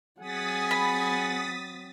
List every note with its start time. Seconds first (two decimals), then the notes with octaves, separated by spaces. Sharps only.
0.20 F#3 C4 G#4 F#5 G#5 D#6 A6 B6
0.71 B5